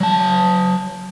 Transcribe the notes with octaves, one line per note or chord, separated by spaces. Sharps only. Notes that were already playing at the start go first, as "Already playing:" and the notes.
F#3 A5